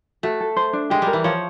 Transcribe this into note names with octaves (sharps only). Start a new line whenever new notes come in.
A3 F#4
A4
C5
D4
G#3 G4
G3
A#4
E3
F3 C#5